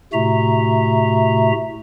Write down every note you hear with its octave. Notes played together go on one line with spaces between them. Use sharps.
A2 C3 A3 F#4 E5 A#5